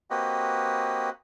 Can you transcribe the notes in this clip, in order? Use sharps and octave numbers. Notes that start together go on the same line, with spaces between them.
A#3 C4 F#4 G4 B4 D#5